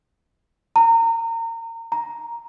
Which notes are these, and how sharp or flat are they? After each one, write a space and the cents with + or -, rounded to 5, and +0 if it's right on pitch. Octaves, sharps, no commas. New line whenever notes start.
A#5 -30
A#5 +0